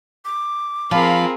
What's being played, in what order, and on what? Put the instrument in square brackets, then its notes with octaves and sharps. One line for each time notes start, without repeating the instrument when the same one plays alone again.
[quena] D6
[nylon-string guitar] F3 [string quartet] C4 G#4 A#4 [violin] F5 B5